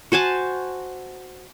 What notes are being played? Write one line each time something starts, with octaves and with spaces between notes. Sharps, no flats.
F#4 C5 G#5 A5